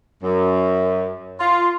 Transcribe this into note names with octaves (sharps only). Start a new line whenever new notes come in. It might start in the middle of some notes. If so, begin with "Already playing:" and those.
F#2
F4